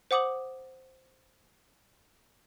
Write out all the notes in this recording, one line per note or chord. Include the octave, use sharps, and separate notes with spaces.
C5 F#5 D6 D#6 F#7